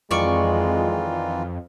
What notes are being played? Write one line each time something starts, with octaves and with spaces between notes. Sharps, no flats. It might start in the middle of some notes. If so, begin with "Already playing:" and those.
F2 D#3 E3 G#3 F4 D5 C#6